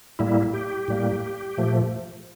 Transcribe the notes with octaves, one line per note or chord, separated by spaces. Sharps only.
A2 G3 A#3 E4
G4
A2 G3 A#3
A#2 F3 A3